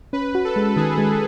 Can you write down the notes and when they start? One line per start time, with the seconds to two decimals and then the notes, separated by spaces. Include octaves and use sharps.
0.13 C#4 B4
0.35 F#4
0.45 A4
0.56 G#3
0.76 D#3 G#4
0.98 G#3